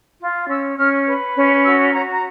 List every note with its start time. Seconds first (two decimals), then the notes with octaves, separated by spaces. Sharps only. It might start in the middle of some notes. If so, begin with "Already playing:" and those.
0.20 F4
0.49 C#4 E6
0.78 C#4 F6
1.06 B4
1.36 C#4
1.63 F#4 E6
1.92 F#4 A#5
2.10 A#5